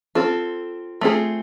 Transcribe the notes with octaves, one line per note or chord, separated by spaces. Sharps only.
C4 F4 A4
A3 C4 F4 G#4